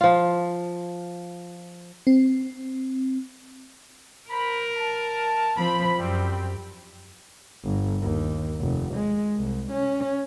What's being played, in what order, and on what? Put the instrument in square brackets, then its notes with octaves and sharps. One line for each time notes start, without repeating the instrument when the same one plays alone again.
[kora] F3 F4
[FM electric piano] C4
[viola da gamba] A#4 [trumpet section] C5 A#5 B5
[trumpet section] A5
[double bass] F3 [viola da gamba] C4 C5 [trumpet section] B5
[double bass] F#2 [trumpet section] G3 C4 [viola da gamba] G4
[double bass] G1
D#2
F1
G#3
C2
C#4